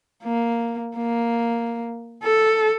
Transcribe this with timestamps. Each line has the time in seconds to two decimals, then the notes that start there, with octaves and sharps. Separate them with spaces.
0.23 A#3
0.97 A#3
2.24 A4